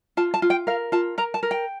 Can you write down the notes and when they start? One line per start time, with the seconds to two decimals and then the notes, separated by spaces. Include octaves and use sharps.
0.17 F4 A5
0.34 A5
0.42 F4
0.50 G5
0.67 A#4 F5
0.92 F4 A5
1.18 A#4 A#5
1.34 A5
1.43 A#4
1.51 G5